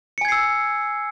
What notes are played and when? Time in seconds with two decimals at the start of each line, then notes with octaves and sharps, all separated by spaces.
0.18 C#7
0.21 G#5
0.25 G#6
0.28 C7
0.32 E6